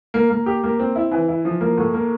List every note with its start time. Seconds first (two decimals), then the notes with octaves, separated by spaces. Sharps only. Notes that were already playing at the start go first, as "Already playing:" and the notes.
0.14 A#3
0.30 A#3
0.46 G4
0.63 A#3
0.79 C4
0.96 E4
1.11 E3
1.28 E4
1.45 F3
1.61 A#3
1.78 A2
1.94 A#3